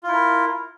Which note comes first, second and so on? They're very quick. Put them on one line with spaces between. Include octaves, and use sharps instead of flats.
F4 E4 A#4